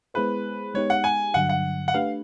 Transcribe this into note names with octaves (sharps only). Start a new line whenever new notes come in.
G#3 B3 E4 G#4 B4 C5
G#3 B3 D#4 G4 C#5
F#5
G#5
G2 D3 F#3 F#5
F#5
F#5
A3 D4 G4 B4 F5